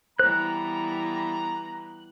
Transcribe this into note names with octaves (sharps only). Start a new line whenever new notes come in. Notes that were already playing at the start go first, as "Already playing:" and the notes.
E3 G3 B3 C5 A#5 F#6